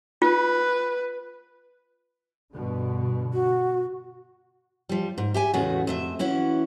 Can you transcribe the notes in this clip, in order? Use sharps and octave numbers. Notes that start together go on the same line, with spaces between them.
F4 B4
G2 B2 D3
F#4
F3 G3
G#2
G4 E5 G#5
E2 A2 C#3 G#3 A3 F#4
F2 A3 E5
E3 C#4 E4 F#4